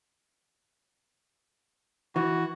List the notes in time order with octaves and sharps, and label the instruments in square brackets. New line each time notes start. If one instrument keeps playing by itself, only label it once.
[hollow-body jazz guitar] E3 [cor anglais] F#4